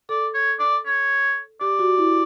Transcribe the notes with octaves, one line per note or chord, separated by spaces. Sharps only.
A4 D5
C#5
D5
C#5
G4 D5
F#4
E4